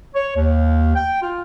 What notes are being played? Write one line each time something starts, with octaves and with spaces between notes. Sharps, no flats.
C#5
D#2
G5
F4